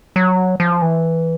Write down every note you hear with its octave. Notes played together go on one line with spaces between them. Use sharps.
F#3
F3
E3